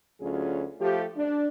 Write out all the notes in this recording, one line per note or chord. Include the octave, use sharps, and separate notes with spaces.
D2 F#3 C#4 F4 G#4
F3 A3 G4
D4